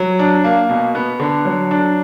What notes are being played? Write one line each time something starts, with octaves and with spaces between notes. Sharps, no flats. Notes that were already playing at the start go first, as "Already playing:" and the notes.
Already playing: F#3
D4
A#3
B2
B3
D3
F#3
D4